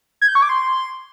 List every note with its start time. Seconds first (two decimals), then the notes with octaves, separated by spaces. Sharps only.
0.21 G#6
0.28 G6
0.35 C#6
0.42 D6
0.49 C6